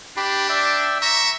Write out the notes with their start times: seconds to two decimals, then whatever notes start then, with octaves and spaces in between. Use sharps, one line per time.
0.17 D4 G4 B5
0.49 D5 E5 G5
1.02 E5 A#5 C#6